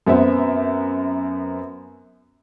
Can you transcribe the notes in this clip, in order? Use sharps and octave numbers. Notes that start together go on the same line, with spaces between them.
F#2 B3 C4 E5